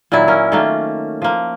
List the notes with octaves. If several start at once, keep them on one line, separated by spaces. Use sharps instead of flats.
A#2 D#3 F#3 E4
A#3 C#4 A#4
D#3 A3 A#3
F3 A#3